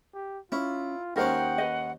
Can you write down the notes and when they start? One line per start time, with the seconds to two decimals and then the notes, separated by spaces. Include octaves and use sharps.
0.14 G4
0.52 C#4 E4 F4
1.16 D#2 G#3 C#4 D#4 A#4 C5 F#5 G5
1.58 B4 D#5